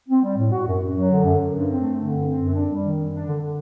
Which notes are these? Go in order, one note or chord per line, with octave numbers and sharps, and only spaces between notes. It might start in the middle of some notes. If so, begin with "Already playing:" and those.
C4
G3
A2
F#4
F#2
F#2
F#3
D3
F#2
F#2
G2
C4
A3
D3
G2
C4
F#2
D4
G3
D#3
F#2
D4
D3
D3